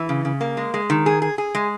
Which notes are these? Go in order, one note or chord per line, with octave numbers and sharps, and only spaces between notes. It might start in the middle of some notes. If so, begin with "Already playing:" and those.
Already playing: E3
C#3
C#3
A#3
G#3
G#3
D#3
G#4
G#4
G#4
G#3